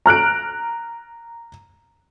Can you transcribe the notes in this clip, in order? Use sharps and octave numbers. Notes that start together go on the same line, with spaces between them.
A#5 F6 F#6 D7